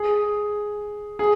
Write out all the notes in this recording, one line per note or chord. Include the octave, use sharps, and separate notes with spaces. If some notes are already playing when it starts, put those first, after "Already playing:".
Already playing: G#4
G#4